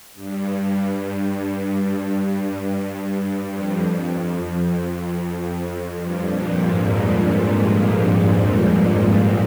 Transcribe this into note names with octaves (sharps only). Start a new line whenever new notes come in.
G2
G2
G2
G2
F2
F2
G2
A#2
G#2